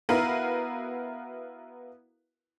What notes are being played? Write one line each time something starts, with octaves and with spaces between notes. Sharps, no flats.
B3 E4 F#4 A#4 B4 F5